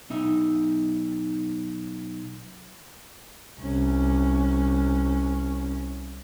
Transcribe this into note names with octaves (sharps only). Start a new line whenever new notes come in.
B1 D#4 E5
C2 C#4